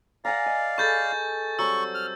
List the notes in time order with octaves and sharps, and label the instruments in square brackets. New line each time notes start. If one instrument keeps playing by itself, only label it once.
[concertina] D5 F5 [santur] F#5 G#5 A#5
[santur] D#5
[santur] G#4 A4 B4 [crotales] C#6 G6 A6
[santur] F#3 G3 C4 [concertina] C#6 [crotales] E6
[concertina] F6